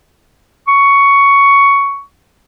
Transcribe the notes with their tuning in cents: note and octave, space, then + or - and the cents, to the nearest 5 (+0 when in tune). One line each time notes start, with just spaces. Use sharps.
C#6 +10